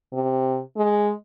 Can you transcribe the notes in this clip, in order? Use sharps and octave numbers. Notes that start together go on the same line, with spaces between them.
C3
G#3